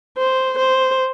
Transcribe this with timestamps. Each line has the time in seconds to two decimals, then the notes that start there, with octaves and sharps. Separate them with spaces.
0.18 C5
0.59 C5